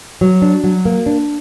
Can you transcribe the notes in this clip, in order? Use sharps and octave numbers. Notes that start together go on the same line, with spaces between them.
F#3
D4
F#3
A#3
D4